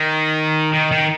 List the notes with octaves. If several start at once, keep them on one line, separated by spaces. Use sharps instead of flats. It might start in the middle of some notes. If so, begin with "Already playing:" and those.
Already playing: D#3
D#3
D#3